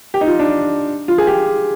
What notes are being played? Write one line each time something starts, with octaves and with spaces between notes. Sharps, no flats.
G4
D#4
F4
D4
F4
G#4
G4